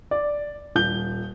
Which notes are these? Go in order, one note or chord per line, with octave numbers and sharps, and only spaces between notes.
D5
D#1 G6 G7